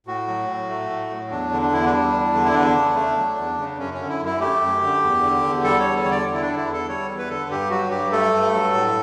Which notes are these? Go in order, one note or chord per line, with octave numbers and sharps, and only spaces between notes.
A2 F#4
F#3
A2
A3
A2
F#3
E2 D4
D3
D4
E2 E4
D4
G3
E2
D3
E4
E2 D4
C#3
A3
F#3
E2
C#3
F#2 C#4
C#4
D3
E4
F#2
E4
A3 G4
F#2
D3
E2
D3
E2
G3 A4
C#5
E2
D3 C#5
D5
E2
E4
D4
D3
E4
E2
A4
G3 C#5
E2
B4
D3 A4
G2 G4
F#3 F#4
G2 G4
A3 A4
G2
F#3
A2